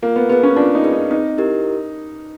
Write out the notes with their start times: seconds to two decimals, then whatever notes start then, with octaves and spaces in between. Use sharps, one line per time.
0.03 A#3 F4
0.16 B3
0.29 B3 G#4 B4
0.43 C#4
0.56 D4 F4
0.75 D#4
0.84 G#4 B4
0.92 D#4
1.11 C4 D#4
1.38 E4 G4 A#4